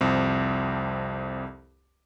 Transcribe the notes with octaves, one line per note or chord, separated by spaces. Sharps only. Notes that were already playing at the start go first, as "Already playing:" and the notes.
C2 F2 C4